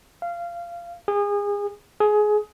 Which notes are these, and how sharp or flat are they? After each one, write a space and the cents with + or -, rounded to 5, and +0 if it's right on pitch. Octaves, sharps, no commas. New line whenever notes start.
F5 -20
G#4 -30
G#4 +20